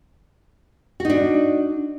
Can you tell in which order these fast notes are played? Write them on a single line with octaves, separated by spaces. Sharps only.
F#4 D#4 D4